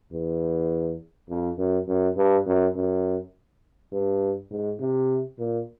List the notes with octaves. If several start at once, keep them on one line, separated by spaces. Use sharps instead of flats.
E2
F2
F#2
F#2
G2
F#2
F#2
G2
G#2
C3
A#2